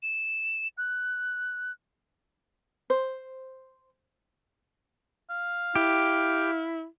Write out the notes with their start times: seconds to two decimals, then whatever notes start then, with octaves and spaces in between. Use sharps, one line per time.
0.03 E7
0.78 F#6
2.90 C5
5.30 F5
5.76 E4 G4